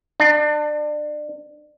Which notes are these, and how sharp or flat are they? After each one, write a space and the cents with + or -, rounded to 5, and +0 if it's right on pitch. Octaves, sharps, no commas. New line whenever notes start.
D4 +30